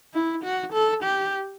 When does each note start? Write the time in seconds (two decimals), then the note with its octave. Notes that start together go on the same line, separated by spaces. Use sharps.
0.14 E4
0.43 F#4
0.73 A4
1.03 G4